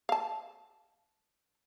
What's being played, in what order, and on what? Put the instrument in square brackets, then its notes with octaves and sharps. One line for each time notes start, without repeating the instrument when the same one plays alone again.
[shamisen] F5 A5